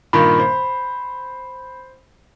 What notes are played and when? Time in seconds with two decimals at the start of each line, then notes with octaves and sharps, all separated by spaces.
0.13 G2 A#2 D#3 B5
0.39 C5